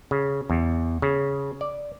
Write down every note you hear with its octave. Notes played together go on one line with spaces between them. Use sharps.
C#3
E2
C#3
D5